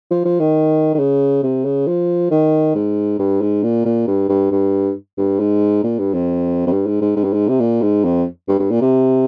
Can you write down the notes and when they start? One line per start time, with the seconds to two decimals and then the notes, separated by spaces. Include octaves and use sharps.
0.11 F3
0.25 F3
0.40 D#3
0.95 D#3
0.99 C#3
1.43 C3
1.65 C#3
1.87 F3
2.31 D#3
2.75 G#2
3.19 G2
3.41 G#2
3.63 A#2
3.85 A#2
4.07 G2
4.29 G2
4.52 G2
5.17 G2
5.40 G#2
5.84 A#2
5.99 G2
6.14 F2
6.66 F2
6.72 G2
6.86 G#2
7.01 G#2
7.16 G#2
7.24 G2
7.33 G#2
7.48 C3
7.60 A#2
7.82 G#2
8.05 F2
8.48 G2
8.59 G2
8.70 A#2
8.81 C3